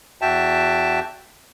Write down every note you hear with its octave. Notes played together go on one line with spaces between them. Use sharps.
E2 F#4 E5 G5 A5